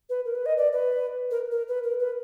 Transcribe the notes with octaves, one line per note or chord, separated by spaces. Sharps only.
B4
A#4
B4
D#5
D5
B4
A#4
A#4
B4
A#4
B4